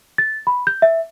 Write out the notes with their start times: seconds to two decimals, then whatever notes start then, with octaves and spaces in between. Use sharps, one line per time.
0.18 A6
0.47 B5
0.67 G6
0.82 E5